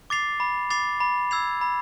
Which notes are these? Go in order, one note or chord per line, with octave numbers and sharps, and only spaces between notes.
D6 A6 C7 F7
B5
D6 A6 C7 F7
B5
E6 G#6 C7 F7
B5